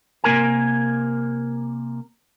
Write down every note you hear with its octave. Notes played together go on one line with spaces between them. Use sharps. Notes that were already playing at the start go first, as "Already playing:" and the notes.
C3 A#3 A#4 G#5